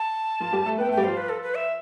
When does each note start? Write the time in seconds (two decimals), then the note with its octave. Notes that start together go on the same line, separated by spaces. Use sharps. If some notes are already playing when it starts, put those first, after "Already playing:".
Already playing: A5
0.40 F3 F4
0.53 G3 G4
0.65 A3 A4
0.78 B3 B4 G5
0.89 A3 A4
0.92 G5
0.97 G3 G4
1.04 F3 F4 C5
1.17 B4
1.29 A4
1.42 B4
1.55 E5